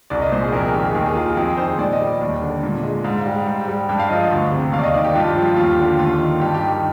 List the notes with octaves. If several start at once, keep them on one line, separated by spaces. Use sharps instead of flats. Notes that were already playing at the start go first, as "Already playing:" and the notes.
C2 D5
D#5
A#2 C5
G#4
F2 A#4
G#4
D#3 G4
G#4
D#2 A#4
G#4
D#3 F4
G4
F2 G#4
D#3 C5
A#2 D5
D#5
G3
D5
D#2
D3
A#2
G#3
G#2 F5
G3
G#2
G3
G2 G5
F5
F3 D#5
D#5
D2
C3
D#2 F5
D5
D#5
D#3 D5
G4
G2 F4
G4
F3
G4
D#2 F4
G4
D3
G4
D#2 F4
D#3
G2 G4
G4
D#3
G4